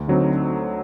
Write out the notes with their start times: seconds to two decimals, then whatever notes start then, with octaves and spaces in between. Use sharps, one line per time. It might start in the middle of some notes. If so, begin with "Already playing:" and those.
Already playing: D2
0.08 D3 F#3 C4 D#4